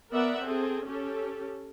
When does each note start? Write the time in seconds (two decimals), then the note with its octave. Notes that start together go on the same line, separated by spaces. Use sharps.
0.12 B3 A#4 D5 E5 F#5
0.43 C4 G#4 A4
0.87 C#4 G4 A4